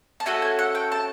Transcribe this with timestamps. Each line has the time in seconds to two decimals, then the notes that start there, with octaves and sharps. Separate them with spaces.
0.20 A5
0.26 A3 C#4 F#4 A4 G#5
0.42 G#5
0.59 F#5
0.75 G5
0.92 A5